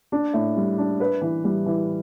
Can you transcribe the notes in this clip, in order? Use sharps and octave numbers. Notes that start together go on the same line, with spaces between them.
D4
A2
G3
D4
B4
E3
G3
E3